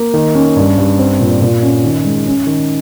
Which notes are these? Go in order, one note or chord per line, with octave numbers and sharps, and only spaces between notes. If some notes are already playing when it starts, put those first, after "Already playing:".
Already playing: A#3
D#3
C#4
G2
G2
C4
A#2
A#2
C#4
D#3
G#3
C#4
D#3